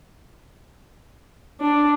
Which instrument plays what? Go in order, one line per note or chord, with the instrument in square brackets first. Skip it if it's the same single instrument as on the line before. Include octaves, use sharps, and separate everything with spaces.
[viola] D4